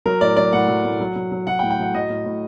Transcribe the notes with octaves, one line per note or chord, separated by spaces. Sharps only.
F#3 A#4
A2 D5
F#3 D5
A2 F#5
F#3
A2
F#3
F#3
F#3
F#3 F#5
G5
A2
G5
F#3 F#5
F#3 D#5
A2
A2